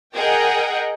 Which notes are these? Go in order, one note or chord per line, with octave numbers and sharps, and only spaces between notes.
G#4 A#4 D#5 F#5 G5